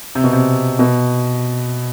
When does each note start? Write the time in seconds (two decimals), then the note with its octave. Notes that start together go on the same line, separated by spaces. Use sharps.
0.15 C3
0.24 B2
0.33 C3
0.79 B2